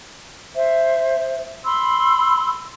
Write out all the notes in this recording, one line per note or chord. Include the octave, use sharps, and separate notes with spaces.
C5 E5
B5 C6 E6